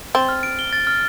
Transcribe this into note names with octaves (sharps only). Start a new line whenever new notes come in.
C4 A6
F6
D7
G7
A6
F6